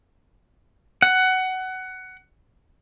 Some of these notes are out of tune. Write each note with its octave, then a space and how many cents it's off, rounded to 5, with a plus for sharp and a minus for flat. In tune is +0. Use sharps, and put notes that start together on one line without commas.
F#5 +15